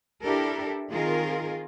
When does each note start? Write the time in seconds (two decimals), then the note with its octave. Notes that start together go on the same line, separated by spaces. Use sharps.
0.22 D4 E4 G4 A4 A#4
0.90 D#3 C4 F4 G#4 A#4